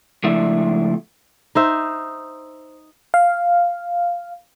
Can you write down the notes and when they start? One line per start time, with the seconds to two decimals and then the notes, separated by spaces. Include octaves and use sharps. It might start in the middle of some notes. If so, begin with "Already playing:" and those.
0.23 C#2 F3 A3 D4 E4 E5
1.55 D#4 C5 E5
3.14 F5